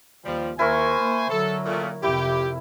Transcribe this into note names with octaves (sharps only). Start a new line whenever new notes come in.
D#2 F3 G3
D#2 E4 A#4 C5 G#5 C#6
A#3
D3 F#3 A4
A#2 A3
F2 C3 E4 G4